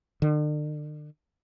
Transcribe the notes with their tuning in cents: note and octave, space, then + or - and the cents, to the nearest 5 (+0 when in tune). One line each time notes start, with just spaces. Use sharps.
D3 +40